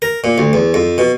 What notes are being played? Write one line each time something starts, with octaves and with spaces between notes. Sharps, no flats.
A#4
A#2
D2
E2
F2
B2